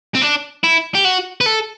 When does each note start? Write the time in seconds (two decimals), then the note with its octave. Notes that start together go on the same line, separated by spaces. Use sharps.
0.15 C4
0.22 D4
0.63 E4
0.95 G4
1.05 F#4
1.41 B4
1.46 A4